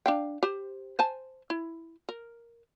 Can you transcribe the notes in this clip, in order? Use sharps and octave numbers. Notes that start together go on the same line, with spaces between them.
D4 F5 G5
G4 C5
C5 G#5 A5
E4
A#4